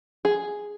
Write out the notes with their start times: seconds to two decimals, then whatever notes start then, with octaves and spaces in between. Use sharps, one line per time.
0.25 G#4